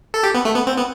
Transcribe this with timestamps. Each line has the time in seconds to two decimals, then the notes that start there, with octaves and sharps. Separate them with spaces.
0.14 A4
0.23 G4
0.34 B3
0.45 A3
0.55 B3
0.67 C4
0.77 B3